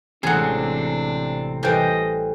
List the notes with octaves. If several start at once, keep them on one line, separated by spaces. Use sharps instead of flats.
A1 C3 G#3 C4 D4 G#4 F#5
E3 G3 A4 C5 D#5 G5